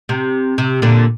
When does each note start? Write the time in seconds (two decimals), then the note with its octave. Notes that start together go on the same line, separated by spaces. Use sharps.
0.09 C3
0.58 C3
0.82 A#2 D3